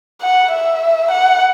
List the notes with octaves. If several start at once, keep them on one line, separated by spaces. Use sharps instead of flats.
F#5
E5
F#5